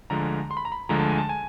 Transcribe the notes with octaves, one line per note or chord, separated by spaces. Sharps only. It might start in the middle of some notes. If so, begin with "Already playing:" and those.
D2 D3 F3 G#3 A#5
C6
B5
A#5
B5
D2 D3 F3 G#3 A#5
A5
G#5
A5
G#5